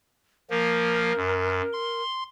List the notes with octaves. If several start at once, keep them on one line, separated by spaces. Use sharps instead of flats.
F3 A#3 A#4
F#2
C6